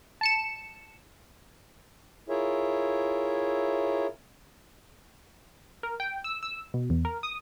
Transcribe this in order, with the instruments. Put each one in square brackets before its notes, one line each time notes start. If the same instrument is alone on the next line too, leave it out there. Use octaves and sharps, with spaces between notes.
[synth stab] A5 C#7 E7
[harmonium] E4 F4 G#4 A#4 C#5 E5
[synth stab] A#4
G5
E6
E6
B2
E2
A#4
D#6